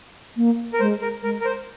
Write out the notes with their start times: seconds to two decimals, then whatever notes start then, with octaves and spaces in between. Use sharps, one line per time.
0.36 A#3
0.73 A#4
0.80 G#3 C5
1.01 A#4
1.23 G#3 A#4
1.41 A#4
1.45 C5